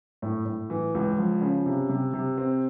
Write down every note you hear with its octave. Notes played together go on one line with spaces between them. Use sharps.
A2
A2
E3
C#2
F3
C#3
C3
C3
C3
C4